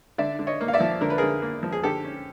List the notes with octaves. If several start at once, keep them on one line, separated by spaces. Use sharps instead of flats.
D3 D5 E5
D3
C#5 D#5
A#3
F5
D5 E5
F3
D3 A#4
B4
D3 G#4 A#4
A#3
F3
G#4
D3 G4 A4
C#4